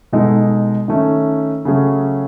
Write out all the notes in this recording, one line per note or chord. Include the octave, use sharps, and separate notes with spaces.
B2 G#3 D#4 A4
D#3 A3 C#4
C#3 F#3 A3 C#4 G#4